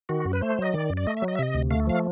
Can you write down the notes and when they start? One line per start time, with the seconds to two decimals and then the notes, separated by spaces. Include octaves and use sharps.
0.09 D#3 F#4
0.25 F#2
0.33 B4
0.41 A3 C5
0.58 F#3 D#5
0.74 D#3 D5
0.90 F#2
0.97 D5
1.07 A3 D#5
1.17 E5
1.22 F#3
1.28 D#5
1.35 E5
1.39 C3 D#5
1.54 D2
1.71 A3 F5
1.87 F3 F5